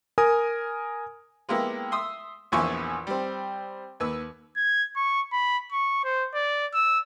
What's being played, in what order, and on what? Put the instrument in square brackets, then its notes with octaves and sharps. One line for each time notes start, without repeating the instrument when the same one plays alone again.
[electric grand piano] A#4 G#5 D#6
[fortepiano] G#3 A#3 B3 E4 G4
E5 C6 D#6 E6
A#1 E2 F3 E4 G#5 C#6
G3 C4
D#2 B4 E6
[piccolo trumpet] G#6
C#6
B5
C#6
C5
D5
E6